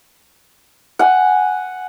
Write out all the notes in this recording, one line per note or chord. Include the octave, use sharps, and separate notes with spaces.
F#5 G#5